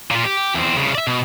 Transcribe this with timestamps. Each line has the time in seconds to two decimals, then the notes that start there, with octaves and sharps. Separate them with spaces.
0.11 A#2 F4
0.25 G4
0.55 E2 C4
0.77 C2 C#3
0.95 D5 E5
1.07 B2